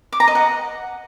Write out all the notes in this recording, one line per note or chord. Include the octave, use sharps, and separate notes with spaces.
D6
A#5
D#5
F#5